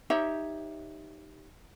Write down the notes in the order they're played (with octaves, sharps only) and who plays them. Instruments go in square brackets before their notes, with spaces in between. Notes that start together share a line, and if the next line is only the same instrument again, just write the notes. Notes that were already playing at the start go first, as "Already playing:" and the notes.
[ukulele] D#4 G4 C#5 E5